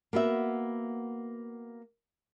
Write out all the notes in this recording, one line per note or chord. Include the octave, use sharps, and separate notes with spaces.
A#3 B3 F#4 E5